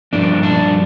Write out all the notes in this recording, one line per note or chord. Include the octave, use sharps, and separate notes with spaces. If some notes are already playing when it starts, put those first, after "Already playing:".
G2 F3 A#3 D4
D4